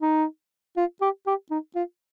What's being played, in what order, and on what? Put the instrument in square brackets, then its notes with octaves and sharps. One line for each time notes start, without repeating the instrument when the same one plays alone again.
[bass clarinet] D#4
F4
G4
G4
D#4
F4